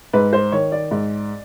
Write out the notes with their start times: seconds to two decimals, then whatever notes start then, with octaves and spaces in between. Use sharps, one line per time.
0.13 G#2 B4
0.33 C5
0.52 D#3 C#5
0.72 D5
0.91 G#2